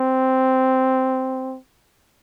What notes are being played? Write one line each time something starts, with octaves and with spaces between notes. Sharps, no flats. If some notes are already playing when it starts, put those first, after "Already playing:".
Already playing: C4